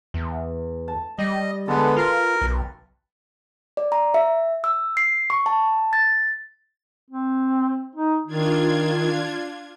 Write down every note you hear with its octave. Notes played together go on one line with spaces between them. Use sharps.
E2
A5
G3 D#5
D3 G#3 B3 A4 B4
F4 A#4
B1
D5
A#5
E5
E6
C7
C#6
A5
A6
C4
D#4
D#3 D4 F4 G#6